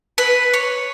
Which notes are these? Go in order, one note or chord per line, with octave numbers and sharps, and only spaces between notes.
B4
C#5